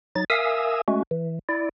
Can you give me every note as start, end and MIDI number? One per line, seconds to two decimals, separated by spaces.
0.16 0.24 54
0.16 0.24 63
0.16 0.24 93
0.30 0.81 70
0.30 0.81 76
0.30 0.81 77
0.30 0.81 80
0.30 0.81 87
0.30 0.81 88
0.88 1.03 56
0.88 1.03 57
0.88 1.03 61
0.88 1.03 66
1.11 1.39 52
1.49 1.69 64
1.49 1.69 74